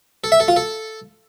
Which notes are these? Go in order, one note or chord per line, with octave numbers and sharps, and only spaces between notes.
A4
E5
A4
F4
A4